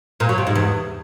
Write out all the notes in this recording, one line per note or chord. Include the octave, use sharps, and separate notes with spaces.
A#2
F#3
C3
G#2
E2